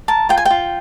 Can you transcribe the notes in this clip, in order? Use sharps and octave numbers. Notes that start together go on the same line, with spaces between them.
A#4 A5
F4 G5
G#5
F4 G5